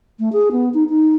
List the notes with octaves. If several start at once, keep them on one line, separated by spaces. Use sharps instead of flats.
A3
G#4
B3
D#4
D#4